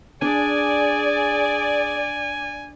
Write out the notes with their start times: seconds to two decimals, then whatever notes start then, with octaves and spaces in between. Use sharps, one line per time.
0.22 D4 G#4 D5 G#5